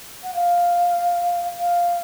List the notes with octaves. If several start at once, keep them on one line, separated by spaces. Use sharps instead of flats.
F#5
F5
F5